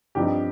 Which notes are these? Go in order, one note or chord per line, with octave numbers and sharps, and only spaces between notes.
G2 F3 C4 D#4 G4